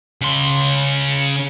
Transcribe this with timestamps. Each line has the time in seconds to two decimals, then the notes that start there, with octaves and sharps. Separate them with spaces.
0.21 C#3 C6